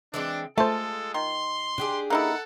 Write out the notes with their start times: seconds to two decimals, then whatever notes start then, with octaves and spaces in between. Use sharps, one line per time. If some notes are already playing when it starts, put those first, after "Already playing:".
0.14 E3 G#3 C4 D4
0.58 G#3 A3 F4 A4 C5 A5
1.14 D#3 C6
1.78 D4 G4 G#4
2.10 A#3 D#4 E4 A4 F#5